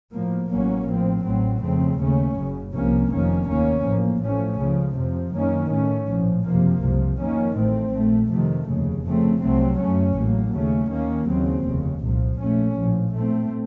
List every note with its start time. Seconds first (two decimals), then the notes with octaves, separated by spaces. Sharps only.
0.14 A2 F3 A#3
0.51 A1 A2 F#3 A#3 C#4
0.88 A2 F3 C4
1.25 A1 A2 F#3 C4
1.63 F2 C#3 A3 C4
1.99 D#2 C#3 A3 C#4
2.36 F#1 F#2 C#3
2.74 C2 C3 F3 A#3 C#4
3.12 F1 F2 D#3 A#3 C#4
3.49 D#2 D#3 A#3 C#4
3.85 A1 A2 F3 A#3
4.22 A1 A2 F3 A3 C#4
4.60 C#2 C#3 F3
4.98 F2 C3 F3
5.34 F#2 D#3 A#3 C#4
5.71 A2 A3 C#4
6.09 A#1 A2 F3
6.45 F#1 F2 C3 F3 A#3
6.82 C2 C3 F3
7.19 F2 D#3 A#3 C#4
7.57 A1 A2 A3 C4
7.94 A#1 A#2 A3
8.31 F2 C3 D#3 A3
8.69 F1 D#2 C#3
9.06 F2 C#3 A3 C4
9.43 C2 C3 F#3 A3 C4
9.80 F#2 C#3 A3 C#4
10.17 A1 A2 F#3 A#3
10.54 D#2 C#3 A3 C#4
10.91 D#2 D#3 A#3 C#4
11.28 D#2 C#3 F#3 C4
11.65 F1 D#2 C#3
12.02 C2 A#2 F3
12.40 A#1 A#2 A3 C#4
12.77 A#1 A2 F3
13.15 A2 A3 C4